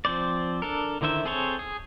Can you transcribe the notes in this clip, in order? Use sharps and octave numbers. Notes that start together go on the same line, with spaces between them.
F3 C4 C5 D5
D4 A4 A#4
D3 D#3 E4 C5 E5
C4 G#4 A4 C5 C#5
G#4